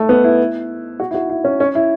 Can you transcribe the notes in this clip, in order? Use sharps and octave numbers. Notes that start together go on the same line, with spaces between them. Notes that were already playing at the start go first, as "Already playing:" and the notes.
Already playing: A3
B3
E4
F#4
E4
F#4
E4
C#4
C#4
E4